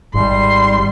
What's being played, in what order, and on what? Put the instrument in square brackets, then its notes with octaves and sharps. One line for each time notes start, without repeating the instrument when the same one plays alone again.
[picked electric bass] G#1 [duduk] G3 [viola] C6